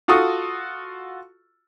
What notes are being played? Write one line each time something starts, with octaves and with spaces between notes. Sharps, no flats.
F4 F#4 A4 C#6 D#6